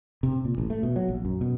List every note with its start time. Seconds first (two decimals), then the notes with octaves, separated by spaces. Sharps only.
0.23 C3
0.45 A#2
0.58 A1
0.70 A3
0.83 B2
0.96 F#3
1.08 A#1
1.25 F#2
1.41 B2